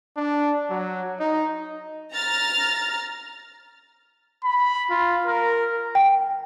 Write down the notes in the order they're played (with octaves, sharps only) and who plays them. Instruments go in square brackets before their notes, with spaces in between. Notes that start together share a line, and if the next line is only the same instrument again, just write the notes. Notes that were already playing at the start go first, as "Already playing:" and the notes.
[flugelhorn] D4
F#3
D#4
[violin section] A#5 F6 A6
[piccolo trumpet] B5
F4
A#4
[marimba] G5